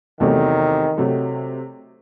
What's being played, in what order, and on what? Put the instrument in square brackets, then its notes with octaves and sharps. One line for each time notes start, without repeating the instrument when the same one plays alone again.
[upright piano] E2 C3 F#3 A3 [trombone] D#3
[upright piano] C3 F#3 A3